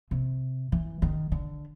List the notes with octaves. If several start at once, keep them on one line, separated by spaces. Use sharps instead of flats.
C3
E3
D#3
D3